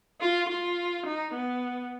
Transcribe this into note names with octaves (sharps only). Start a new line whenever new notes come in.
F4
F4
D#4
B3